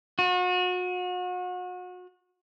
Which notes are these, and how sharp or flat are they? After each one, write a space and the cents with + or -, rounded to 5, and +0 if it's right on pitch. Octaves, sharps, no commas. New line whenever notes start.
F#4 -35